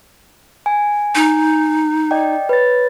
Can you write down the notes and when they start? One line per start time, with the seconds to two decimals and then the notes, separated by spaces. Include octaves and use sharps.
0.66 G#5
1.15 D#4
2.11 D5 D#5 G5
2.49 B4 C#5 A6